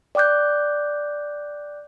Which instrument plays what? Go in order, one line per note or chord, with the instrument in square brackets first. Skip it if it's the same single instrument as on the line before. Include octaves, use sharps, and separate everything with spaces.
[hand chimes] D5 G5 D6 F#6 G6